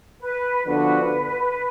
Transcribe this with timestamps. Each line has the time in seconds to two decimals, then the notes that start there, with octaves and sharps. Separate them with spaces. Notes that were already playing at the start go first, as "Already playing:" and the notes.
0.20 B4
0.65 D3 F3 B3 D4 F#4 B4